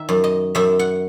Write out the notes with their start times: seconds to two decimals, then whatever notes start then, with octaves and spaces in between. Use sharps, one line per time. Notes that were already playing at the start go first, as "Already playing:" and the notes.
Already playing: D#3 E5
0.09 F#2
0.24 D#5
0.55 F#2 E5
0.79 F#5